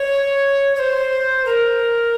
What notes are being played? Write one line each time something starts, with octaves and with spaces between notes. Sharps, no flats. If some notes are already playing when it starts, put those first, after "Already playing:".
Already playing: C#5
C#5
C5
A#4